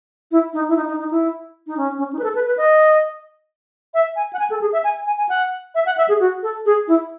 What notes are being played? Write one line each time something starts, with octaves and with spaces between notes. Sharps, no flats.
E4
D#4
E4
D#4
D#4
D#4
E4
D#4
C#4
C#4
D#4
B4
A4
B4
B4
D#5
E5
G#5
F#5
G#5
A4
G#4
E5
G#5
G#5
G#5
F#5
E5
F#5
E5
G#4
F#4
A4
G#4
E4